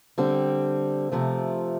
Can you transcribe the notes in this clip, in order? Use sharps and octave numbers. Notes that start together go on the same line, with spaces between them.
D3 G3 C4
C3 F3 A3